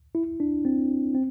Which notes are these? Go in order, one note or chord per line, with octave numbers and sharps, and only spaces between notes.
E4
D4
C4
C4